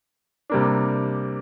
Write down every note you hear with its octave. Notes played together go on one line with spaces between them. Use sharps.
C3 G3 A#3 D4